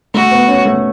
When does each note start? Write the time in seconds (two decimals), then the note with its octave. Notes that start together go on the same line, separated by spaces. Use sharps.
0.14 A3 F#4
0.31 B3
0.48 C#4
0.66 A3